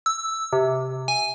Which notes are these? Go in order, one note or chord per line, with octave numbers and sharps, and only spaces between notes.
E6
C3
G#5